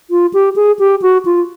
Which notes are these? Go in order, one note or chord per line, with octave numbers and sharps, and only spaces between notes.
F4
G4
G#4
G4
F#4
F4